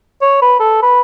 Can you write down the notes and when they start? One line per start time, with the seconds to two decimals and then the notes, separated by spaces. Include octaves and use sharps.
0.22 C#5
0.42 B4
0.60 A4
0.82 B4